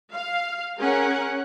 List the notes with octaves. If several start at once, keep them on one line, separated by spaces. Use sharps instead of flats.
F5
C#4 G#4 A#4 F#5